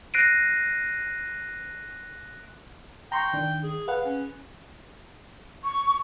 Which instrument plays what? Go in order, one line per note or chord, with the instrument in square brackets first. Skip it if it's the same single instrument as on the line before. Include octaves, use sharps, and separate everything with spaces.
[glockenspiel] F#6 A#6 C7 D7 D#7
[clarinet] G5 [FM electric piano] A#5 C6 C#6
[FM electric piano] D#3 D4
[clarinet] G#4
[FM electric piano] G#4 B4 F#5 [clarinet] F5
[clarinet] C#4
[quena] C#6